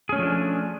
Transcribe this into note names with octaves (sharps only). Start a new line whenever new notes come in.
F3 A3 C#4 D4 G#4